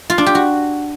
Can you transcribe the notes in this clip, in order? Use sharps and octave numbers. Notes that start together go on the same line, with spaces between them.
F4
D4
G4
F#4